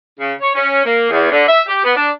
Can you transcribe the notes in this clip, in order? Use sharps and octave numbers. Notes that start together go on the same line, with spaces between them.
C#3
C#5
C#4
A#3
E2
D3
E5
G4
B3
D4